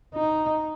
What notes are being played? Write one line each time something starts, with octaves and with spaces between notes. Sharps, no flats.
D#4